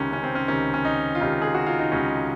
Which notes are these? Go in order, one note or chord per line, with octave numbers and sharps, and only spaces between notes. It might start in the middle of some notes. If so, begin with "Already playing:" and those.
Already playing: C#2 C3 D#3 C#4
C#4
C4
C#4
C#2 C3 D#3 C#4
C#4
D#4
F4
C#2 C3 D#3 D#4
G#4
F#4
F4
D#4
C#2 C3 D#3 C#4